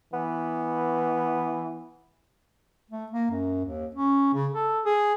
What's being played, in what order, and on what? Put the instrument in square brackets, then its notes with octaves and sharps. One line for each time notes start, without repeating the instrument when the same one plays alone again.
[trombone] E3 [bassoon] B3
[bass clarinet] A3
A#3
F#2
D#2
C#4
C#3
A4
G#4